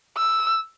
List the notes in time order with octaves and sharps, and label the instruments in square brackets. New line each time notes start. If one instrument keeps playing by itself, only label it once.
[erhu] E6